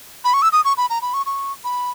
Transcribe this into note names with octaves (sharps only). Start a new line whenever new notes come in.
B5
C#6
E6
D#6
C#6
B5
A#5
B5
C#6
C#6
B5